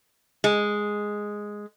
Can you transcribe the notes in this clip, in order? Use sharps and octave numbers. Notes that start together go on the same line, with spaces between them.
G#3